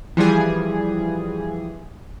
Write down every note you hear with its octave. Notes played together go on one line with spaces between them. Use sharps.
E3 F3 G3 G#4